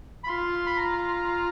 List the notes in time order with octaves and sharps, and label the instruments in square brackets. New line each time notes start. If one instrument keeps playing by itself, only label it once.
[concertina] B5
[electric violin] F4 [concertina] C6
[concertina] B5
A#5